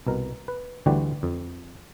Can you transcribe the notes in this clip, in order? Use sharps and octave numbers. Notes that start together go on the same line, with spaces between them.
C2 B2 A#4
B4
D2 D3 E3 G3 F#4 G4
F2